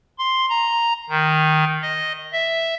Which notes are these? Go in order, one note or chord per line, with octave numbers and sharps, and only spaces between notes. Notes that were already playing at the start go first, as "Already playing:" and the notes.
C6
A#5
D#3
D#5
E5